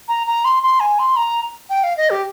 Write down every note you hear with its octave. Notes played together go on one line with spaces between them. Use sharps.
A#5
A#5
C6
C6
G#5
C6
A#5
G5
F5
D#5
G4